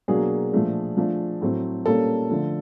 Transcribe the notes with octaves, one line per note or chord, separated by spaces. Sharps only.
B2 F#3 A#3 D4 G#4
A#2 F3 A3 D4
F3 A3 D4
A2 F#3 A3 C4
A#2 G3 A#3 C#4 A4
D3 F3 A3